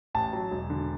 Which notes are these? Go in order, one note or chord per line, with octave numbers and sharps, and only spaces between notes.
A1 A5
F#3
E1
D3